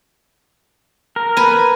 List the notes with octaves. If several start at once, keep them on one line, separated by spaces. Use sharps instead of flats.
A#4
B4 G#5